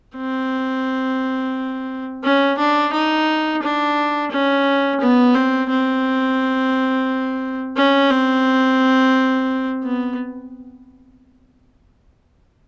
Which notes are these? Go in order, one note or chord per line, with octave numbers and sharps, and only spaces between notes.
C4
C#4
D4
D#4
D4
C#4
B3
C4
C4
C#4
C4
B3